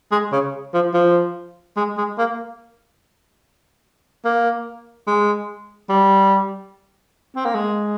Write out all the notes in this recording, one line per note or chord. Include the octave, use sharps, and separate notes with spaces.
G#3
C#3
F3
F3
G#3
G#3
A#3
A#3
G#3
G3
C4
A#3
G#3